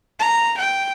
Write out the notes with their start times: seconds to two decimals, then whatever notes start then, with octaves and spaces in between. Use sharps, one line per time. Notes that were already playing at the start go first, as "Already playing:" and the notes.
0.19 A#5
0.58 G5